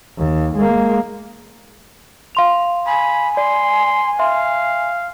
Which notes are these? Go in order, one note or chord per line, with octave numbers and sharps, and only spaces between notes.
D#2
G#3 A#3
F5 C6 F7
G#5 B5
D5 C6
E5 F5 C6